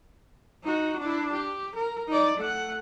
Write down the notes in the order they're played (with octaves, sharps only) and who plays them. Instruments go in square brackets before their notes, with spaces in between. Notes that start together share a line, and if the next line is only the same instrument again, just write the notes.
[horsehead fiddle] D#4 F#4
D4 E4
G4
A#4
D#4 D5
A3 F#5